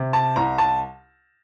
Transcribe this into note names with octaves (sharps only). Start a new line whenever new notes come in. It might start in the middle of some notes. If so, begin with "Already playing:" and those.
Already playing: C3
A5
C2 A#5
A5